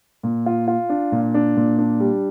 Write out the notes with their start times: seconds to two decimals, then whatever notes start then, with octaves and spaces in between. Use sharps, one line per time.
0.23 A#2
0.46 F4
0.68 F4
0.89 D4
1.12 A#2
1.34 D4
1.57 A#2
1.79 D4
2.00 G3